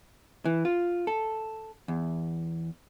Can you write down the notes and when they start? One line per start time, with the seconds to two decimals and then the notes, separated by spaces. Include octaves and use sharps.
0.45 E3
0.65 F4
1.07 A4
1.88 E2